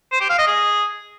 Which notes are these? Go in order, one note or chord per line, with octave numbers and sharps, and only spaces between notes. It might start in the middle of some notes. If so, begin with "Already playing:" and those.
C5
G4
F5
D#5
G#4